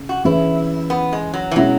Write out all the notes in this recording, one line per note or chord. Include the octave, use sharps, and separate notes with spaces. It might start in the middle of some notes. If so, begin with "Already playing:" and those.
Already playing: C#3
F#4
E3 C#4 E4 G#4 B4
B3
G#3
F#3
E3
B2 F#3 G#3 C#4 E4